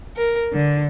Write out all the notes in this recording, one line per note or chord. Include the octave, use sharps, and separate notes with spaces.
A#4
D3